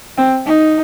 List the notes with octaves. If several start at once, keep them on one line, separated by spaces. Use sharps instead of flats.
C4
D#4